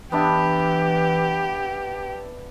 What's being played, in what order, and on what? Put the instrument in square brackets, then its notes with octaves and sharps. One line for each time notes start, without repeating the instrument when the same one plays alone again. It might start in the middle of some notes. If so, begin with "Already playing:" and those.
[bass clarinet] E3 [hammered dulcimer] B3 D4 E5 [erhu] G4